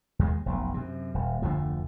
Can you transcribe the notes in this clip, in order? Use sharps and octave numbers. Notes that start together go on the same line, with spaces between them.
D#2 G#3
F1 B1
F#2 C3
D#1
F1 D2 D3 F3